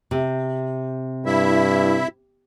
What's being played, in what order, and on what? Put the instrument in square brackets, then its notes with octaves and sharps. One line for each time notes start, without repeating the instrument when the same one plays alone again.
[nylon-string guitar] C3
[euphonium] G2 [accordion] E4 E5